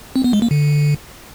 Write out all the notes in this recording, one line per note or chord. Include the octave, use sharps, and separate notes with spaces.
C4
B3
G#3
A#3
D3